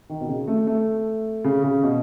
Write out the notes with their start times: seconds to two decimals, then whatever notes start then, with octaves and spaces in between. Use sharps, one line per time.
0.09 D#3
0.21 B2
0.28 C#3
0.48 A3
0.67 A3
1.44 C#3
1.64 C#3
1.83 B2